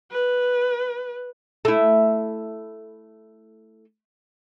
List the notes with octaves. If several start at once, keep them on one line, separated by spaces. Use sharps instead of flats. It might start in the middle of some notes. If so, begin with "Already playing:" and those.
B4
A3 E4